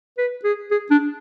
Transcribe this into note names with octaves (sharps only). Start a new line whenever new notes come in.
B4
G#4
G#4
D4